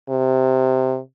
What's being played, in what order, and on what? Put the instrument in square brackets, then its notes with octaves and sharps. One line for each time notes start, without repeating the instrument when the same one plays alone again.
[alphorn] C3